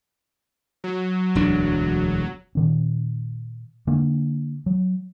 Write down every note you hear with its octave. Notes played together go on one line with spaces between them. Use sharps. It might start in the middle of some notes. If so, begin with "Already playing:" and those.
F#3
E1 D2 D4
A#2 D#3 C#4
D3 A#3 D4
F#3